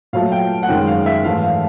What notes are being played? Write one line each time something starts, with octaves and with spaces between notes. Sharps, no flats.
A#2 F#3 A3 F5
G5
F#5
F#2 D#3 G#3 G5
F5
E5
G#2 E3 A3 F5
F5